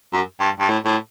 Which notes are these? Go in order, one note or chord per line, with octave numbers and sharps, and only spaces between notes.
F#2
G2
G2
A2
A2